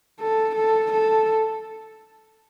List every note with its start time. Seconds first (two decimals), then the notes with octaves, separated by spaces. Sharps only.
0.19 A4
0.56 A4
0.92 A4